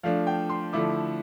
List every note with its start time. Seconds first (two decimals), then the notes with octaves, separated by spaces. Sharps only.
0.03 F3 A3 D4 F5
0.27 G5
0.50 C6
0.73 D3 F3 A3 E4 D6